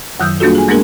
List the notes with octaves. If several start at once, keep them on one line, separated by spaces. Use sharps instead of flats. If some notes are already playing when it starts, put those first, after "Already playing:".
F#2 D#3 F#3 D#6 E6 G6
G3 A#3 D4 F4 F#4 A4
G#4 G#5
G#3 A#3 B3 D4 G#4 A#4